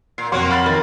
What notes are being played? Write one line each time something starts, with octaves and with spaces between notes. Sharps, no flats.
A#2 C7
F2 F#3 A#3 F#4 F#5 C6
B5 F6 A6
D#3 A#4 A6